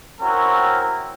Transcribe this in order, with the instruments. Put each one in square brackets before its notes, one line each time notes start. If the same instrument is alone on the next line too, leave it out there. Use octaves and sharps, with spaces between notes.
[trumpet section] C4 C#4 E4 F#4 A#4 C#5